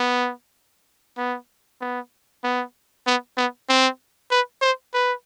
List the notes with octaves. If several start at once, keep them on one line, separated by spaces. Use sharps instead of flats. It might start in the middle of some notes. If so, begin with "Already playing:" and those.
Already playing: B3
B3
B3
B3
B3
B3
C4
B4
C5
B4